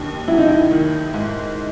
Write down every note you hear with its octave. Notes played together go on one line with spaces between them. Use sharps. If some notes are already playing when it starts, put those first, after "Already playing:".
Already playing: D#2 D4
F#3 E4
D#4
E4
D#3
G#2